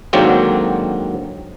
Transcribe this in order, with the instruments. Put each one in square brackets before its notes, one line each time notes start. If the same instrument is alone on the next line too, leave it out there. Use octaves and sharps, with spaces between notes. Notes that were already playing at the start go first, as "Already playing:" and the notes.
[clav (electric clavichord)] G#2 D3 D#3 F#3 A#3 C4